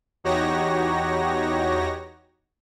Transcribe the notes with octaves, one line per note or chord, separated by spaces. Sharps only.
E2 D#4 F#4 G4 C#5 A#6